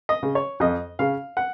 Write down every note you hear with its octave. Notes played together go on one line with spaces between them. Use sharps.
D#5
C#3
C#5
F2 D#5
C#3 F5
F#5